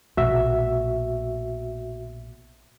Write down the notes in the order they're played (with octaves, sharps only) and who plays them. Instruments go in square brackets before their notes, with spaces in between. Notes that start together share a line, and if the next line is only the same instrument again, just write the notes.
[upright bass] A#1 B2 [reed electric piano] F#4 E5